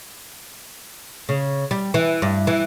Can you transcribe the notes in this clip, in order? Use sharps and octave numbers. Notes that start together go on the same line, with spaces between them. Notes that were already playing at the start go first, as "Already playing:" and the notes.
C#3
G3
E3
G2
E3